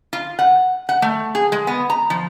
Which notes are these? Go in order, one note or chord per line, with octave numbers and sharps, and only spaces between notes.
F4
F#5
F#5
A3
G#4
G#3
B3
A#5
F3